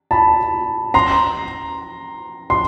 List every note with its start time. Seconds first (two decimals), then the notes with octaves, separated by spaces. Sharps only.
0.11 A5 B5
0.94 A#5 C6
2.50 C6